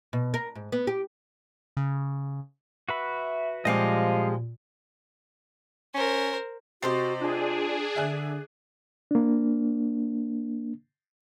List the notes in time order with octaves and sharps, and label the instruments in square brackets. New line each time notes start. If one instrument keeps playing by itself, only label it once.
[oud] B2
A#4
G#2
B3
G4
[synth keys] C#3
[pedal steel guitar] F#4 B4 B5 [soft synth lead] E5
[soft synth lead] A#2 [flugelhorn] F3 [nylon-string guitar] G3 G#3 C4 [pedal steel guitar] D#5 F5 D6
[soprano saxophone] C#4 [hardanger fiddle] A#4 C5
[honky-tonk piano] C3 A6 C7 [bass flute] F#4 [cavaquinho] G4 C5 D#5
[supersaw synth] D4 G#4 [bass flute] F4
[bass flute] D3 [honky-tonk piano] E5 G#5 F#6
[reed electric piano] A#3 D4